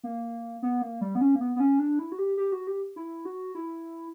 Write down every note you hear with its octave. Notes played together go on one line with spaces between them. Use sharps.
A#3
B3
A#3
G3
B3
C#4
A#3
B3
B3
C#4
D4
E4
F#4
G4
G4
F#4
G4
E4
F#4
E4